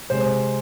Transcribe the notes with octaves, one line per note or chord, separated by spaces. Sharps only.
C3 G#3 C5